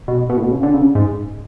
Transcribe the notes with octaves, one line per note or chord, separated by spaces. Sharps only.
B2
B2
A2
B2
C#3
D3
C#3
G#2